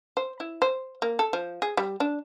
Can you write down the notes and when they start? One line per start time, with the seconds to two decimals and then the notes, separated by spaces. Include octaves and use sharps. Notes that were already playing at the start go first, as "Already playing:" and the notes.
0.17 C5
0.40 E4
0.62 C5
1.02 A#3
1.19 A4
1.33 F3
1.62 G#4
1.77 G3
2.00 D4